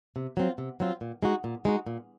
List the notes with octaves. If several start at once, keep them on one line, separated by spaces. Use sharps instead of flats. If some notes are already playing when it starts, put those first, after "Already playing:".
C3
F#3 C4 F4
C3
F#3 C4 F4
A#2
G#3 D#4 F#4
A#2
G#3 D#4 F#4
A#2